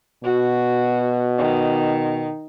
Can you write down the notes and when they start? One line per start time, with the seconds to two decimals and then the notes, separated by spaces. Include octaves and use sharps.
0.24 B2 F#4
1.38 D#3